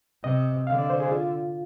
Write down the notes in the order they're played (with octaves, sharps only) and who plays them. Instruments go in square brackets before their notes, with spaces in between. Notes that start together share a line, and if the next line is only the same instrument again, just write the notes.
[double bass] C3 [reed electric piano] D#5
[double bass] D3 [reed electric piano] F5
[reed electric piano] D5
C5
G#4
F4